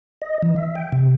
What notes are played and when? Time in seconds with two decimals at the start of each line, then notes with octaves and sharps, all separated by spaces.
0.22 D#5
0.42 E3
0.56 E5
0.75 G5
0.92 C3